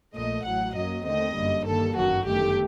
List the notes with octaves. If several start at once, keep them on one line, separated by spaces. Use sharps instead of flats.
A#1 A#2 A3 D#5
A1 A2 F#3 F#5
F#2 F#3 A#3 D#5
D#2 D3 A3 C4 D#5
G1 F#2 D3 G3 A#3
G2 D#3 G3 A#3 A4
G1 F#2 D#3 F#3 F#4
G1 F#2 D#3 A3 G4